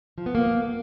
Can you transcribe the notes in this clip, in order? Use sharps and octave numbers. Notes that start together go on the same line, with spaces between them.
F3
B3
A#3